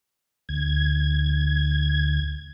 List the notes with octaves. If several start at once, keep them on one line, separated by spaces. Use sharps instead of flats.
D2 G#6